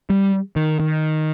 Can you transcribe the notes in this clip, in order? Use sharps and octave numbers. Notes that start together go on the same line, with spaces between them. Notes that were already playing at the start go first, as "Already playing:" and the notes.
G3
D#3
D#3